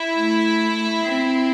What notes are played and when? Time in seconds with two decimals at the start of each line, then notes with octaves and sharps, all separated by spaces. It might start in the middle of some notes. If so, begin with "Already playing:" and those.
Already playing: E4 E5
0.16 A3
1.03 C4